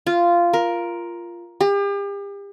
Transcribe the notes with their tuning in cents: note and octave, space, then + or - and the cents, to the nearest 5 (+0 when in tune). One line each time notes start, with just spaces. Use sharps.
F4 -10
A#4 +10
G4 +40